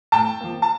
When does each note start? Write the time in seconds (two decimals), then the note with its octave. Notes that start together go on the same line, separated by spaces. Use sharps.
0.12 A2 G5 A5
0.41 F3 A#3
0.62 A5